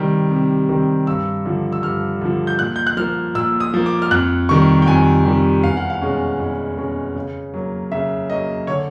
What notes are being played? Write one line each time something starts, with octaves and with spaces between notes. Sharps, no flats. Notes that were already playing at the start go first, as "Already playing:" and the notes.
Already playing: C3 D#3 G3 C4
C3
D#3 G3 C4
G2 E6
D3 F3
E6
G2 F6
D3 F3
G6
A#2 F#6
G6
F#6
F3 A#3 F6
A#2 E6
D#6
F3 A#3
D6
F6
F2 F#6
C3 D#3 G3 C#6
G5
F2 G#5
C3 D#3 G3
E2 F5
F#5
F5
B2 G#3 C#4
E2
B2 G#3 C#4
C#3
F#3 A#3
C#3 E5
F#3 A#3 D#5
D3 C#5